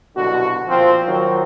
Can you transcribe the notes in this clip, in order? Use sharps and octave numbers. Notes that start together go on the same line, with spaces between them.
C2 B2 D3 F#3 F#4
A#2 F3 C4
D#3 F3 F#3